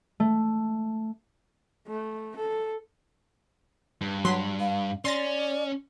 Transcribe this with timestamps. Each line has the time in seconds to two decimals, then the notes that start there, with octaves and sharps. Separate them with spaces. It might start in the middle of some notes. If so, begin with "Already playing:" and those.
0.20 A3
1.87 A3
2.36 A4
4.01 G2
4.25 F#3 C6 B6
4.60 F5
5.05 C#4 D5 C6 A6 A#6